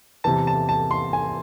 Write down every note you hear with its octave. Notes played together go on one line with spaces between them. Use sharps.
E2 C3 E3 A5
A5
A5
C6
G#5